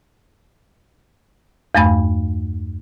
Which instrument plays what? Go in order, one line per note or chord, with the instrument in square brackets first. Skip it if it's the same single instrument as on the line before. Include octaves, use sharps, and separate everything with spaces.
[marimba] E2 G2 A3 F5 B5